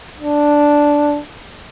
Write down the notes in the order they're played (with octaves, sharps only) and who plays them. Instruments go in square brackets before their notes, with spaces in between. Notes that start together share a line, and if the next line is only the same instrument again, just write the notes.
[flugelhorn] D4